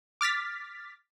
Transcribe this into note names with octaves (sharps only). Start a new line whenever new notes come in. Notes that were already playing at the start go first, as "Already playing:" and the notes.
D6 F6 A6 B6